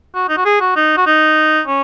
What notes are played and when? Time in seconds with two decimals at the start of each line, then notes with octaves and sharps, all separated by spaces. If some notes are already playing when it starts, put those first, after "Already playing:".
0.15 F#4
0.29 D#4
0.37 F#4
0.45 G#4
0.61 F#4
0.76 D#4
0.97 F#4
1.06 D#4
1.67 C#4